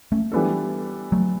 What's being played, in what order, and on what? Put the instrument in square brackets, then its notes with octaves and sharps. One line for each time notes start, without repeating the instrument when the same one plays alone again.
[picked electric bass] A3 C#4
[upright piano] E3 G3 B3 D4 A4
[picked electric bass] F#3 A3